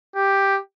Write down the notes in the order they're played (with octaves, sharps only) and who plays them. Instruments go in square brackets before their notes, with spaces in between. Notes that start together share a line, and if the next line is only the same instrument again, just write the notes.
[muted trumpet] G4